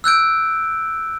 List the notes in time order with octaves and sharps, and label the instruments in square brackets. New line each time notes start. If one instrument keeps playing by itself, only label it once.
[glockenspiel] E6 F#6 G6 D7